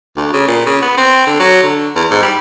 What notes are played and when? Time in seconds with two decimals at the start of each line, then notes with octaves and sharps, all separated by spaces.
0.17 D2
0.33 C#3
0.48 A#2
0.66 C#3
0.82 B3
0.97 C4
1.27 D3
1.40 F#3
1.63 D3
1.95 E2
2.11 G#2
2.22 G3